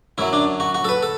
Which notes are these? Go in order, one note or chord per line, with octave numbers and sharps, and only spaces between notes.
F#2 F#3 E4
D4
F#4
F#4
A4
B4
A4